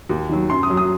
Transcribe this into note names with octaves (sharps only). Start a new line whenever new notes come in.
D#2
D#3 F#3
F#2 C6
D#6
F#3
D#6